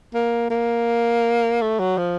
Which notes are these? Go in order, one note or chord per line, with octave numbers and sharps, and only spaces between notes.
A#3
A#3
A3
F#3
F3